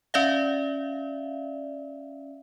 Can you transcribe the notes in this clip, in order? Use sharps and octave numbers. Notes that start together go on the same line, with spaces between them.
C#4 D5 E5 F5